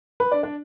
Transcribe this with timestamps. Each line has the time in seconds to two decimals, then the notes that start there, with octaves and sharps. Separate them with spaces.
0.20 B4 B5
0.32 D4 D5
0.43 D4 D5